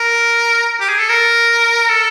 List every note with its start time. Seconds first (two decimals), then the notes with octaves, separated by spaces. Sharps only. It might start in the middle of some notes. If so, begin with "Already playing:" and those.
Already playing: A#4
0.80 G4
0.89 G#4
0.98 A4
1.09 A#4
1.89 A4